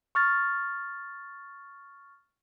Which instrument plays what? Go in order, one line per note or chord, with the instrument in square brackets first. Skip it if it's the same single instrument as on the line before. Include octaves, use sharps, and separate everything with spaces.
[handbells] C#6 F6 A6